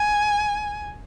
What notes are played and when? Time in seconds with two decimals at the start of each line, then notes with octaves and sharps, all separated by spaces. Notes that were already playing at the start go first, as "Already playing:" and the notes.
Already playing: G#5